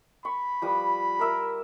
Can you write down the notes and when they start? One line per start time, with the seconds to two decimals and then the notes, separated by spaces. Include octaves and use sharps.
0.25 B5 C#6
0.62 F3 G3 B4
1.19 A#4 E5